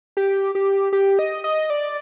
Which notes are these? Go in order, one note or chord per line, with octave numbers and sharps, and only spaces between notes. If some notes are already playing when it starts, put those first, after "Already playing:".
G4
G4
G4
D#5
D#5
D5